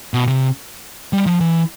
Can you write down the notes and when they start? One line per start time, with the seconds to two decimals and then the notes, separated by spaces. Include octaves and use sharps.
0.14 B2
0.27 C3
1.13 G3
1.26 F3
1.41 E3